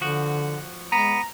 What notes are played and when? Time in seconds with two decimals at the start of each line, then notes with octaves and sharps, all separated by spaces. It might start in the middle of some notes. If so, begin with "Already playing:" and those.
0.01 D3 F3 F#4
0.92 G#3 B3 A#5